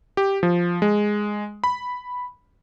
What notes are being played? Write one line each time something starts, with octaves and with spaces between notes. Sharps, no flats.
G4
F3
G#3
B5